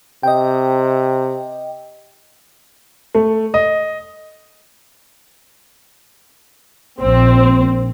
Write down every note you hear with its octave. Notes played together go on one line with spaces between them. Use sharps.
C3 D#5 G5
A3
D#5
A#1 C4